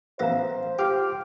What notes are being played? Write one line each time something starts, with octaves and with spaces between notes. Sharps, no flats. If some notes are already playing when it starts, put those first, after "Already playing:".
A1 B3 B4 C5 E5 F5 A#5
F4 G4 G5 D6 F6